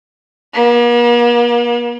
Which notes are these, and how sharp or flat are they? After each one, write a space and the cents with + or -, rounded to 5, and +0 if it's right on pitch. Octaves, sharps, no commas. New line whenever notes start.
A#3 +45